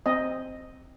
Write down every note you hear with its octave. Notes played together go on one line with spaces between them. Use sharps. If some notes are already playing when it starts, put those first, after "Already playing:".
C4 D#5